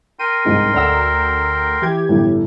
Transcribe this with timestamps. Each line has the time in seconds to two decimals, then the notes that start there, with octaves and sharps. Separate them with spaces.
0.19 A#4 G5 C6 D#7
0.45 C2 G#2 G#3
0.74 D2 D5 F#5 A#5 E6
1.82 E3 G4 G#6
2.09 G1 A2